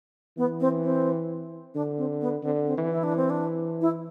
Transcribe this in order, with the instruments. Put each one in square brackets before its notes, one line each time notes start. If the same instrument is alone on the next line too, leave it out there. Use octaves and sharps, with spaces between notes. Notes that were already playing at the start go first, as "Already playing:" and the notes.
[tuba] E3 [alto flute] B3
[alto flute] C4
C4
[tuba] D3 [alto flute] D4
[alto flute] C4
B3
[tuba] D3 [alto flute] C4
[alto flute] C4
[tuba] E3
[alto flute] E4
D4
C4
D4
E4